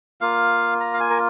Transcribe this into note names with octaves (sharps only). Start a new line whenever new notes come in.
A#3 F4 F5
A#5
F5
G#5
A#4